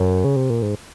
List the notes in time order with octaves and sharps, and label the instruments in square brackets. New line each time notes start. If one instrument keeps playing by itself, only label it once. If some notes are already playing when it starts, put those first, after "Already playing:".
Already playing: [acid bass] F#2
C#3
C3
A#2
G#2